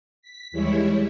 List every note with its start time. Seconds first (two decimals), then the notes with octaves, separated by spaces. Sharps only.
0.22 B6
0.51 D#2 E3 G3 G#3 E4 C#5